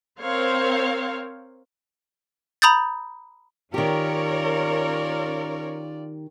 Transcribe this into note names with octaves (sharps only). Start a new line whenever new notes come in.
C4 A#4 C5 C#5 F5
A#5 B5 D#6 G6 A6
D#3 C#4 F4 G4 A#4 C#5 D5